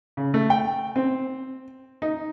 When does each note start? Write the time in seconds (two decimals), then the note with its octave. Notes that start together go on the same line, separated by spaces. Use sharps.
0.17 C#3
0.34 A3
0.50 G5
0.96 C4
2.02 D#4